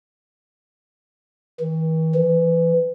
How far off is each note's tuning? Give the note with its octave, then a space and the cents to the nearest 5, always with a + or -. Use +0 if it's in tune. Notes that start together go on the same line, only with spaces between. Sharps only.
E3 -45
E3 +20